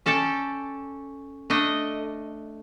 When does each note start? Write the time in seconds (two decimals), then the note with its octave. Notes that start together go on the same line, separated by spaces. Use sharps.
0.06 C#4 A4 D5 G5 A5
1.50 A3 D4 D#5